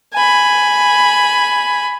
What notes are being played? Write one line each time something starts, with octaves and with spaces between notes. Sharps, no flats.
G#5 B5